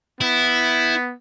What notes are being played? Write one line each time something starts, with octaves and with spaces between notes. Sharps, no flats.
B3 E4